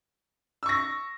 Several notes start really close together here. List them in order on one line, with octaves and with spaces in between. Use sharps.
E6 C#6 A#6